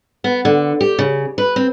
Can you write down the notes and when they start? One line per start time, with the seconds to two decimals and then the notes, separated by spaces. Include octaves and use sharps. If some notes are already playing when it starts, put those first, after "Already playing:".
0.24 B3
0.45 D3
0.81 G4
0.99 C#3
1.38 B4
1.56 C4